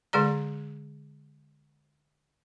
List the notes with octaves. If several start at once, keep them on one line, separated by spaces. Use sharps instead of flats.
D3 G#3 G#4 D5 A#5